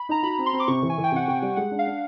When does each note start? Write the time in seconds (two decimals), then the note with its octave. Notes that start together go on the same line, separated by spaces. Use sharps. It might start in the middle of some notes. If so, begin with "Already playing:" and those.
Already playing: B5
0.09 D#4 A#5
0.23 F#4 B5
0.38 C4
0.46 C6
0.53 C4
0.60 D6
0.68 C3 C#6
0.82 E3
0.90 G#5
0.98 E3
1.04 G5
1.12 C3 F#5
1.28 C3 G5
1.42 G3
1.56 G#3 F#5
1.71 D4
1.79 F5
1.87 D4